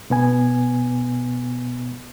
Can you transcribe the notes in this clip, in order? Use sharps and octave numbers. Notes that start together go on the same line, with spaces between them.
B2 B3 G#5